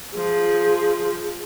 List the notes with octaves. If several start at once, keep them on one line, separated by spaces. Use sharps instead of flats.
F3 G#4